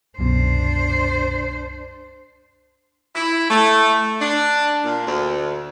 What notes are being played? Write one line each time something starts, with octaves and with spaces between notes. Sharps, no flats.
C2 F#2 B2 D4 C5
E4
A3
D4
A#2
D2